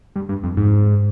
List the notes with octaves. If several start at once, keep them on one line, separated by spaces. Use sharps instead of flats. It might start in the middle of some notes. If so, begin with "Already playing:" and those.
G2
G2
F2
G#2